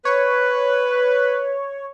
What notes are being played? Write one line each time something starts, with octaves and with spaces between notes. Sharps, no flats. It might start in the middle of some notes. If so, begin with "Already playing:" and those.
B4 C#5